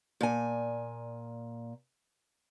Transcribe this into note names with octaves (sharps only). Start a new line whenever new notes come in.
A#2 G#5